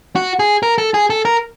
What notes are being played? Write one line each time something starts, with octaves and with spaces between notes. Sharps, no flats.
F#4
G#4
A#4
A4
G#4
A4
A#4